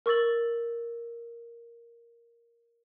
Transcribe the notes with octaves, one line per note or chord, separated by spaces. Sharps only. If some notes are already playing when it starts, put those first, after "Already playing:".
A#4 C#6 E6 A6 F#7